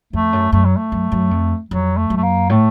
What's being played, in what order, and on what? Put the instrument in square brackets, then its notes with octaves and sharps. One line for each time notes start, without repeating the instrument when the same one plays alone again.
[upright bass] F2 [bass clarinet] A3
[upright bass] F#2
[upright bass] F#2 [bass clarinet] A3
[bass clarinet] F#3
A3
[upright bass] F#2
F#2
F2
[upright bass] F2 [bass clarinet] F#3
[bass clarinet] A3
[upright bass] F#2
[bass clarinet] A3
A#3
[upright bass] A2 [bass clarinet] A3